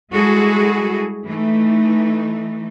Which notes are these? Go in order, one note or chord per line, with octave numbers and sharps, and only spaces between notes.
G3 G#3 E4 F#4 G#4 A4
E3 A3 D#4